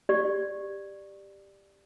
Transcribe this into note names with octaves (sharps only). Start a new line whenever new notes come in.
G4 D5